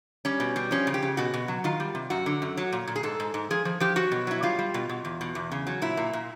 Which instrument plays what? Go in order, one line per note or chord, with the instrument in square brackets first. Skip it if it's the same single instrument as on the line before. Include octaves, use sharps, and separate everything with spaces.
[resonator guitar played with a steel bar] G3 C#4
B2
G3
F3 C#4
C#3
G4
C#3
B2 F#4
B2
F#3
D#3 F4
G3
C3
F#2 F#4
D3
F#2
F#3
A#2
A#2
G#4
G#2 A4
G#2
G#2
F3 G#4
F3
F3 G4
F#3 F#4
B2
F#3 E4
G3 F4
G3
B2
B2
E2
B2
E2
C#3
F#3
A#2 E4
A#2
A#2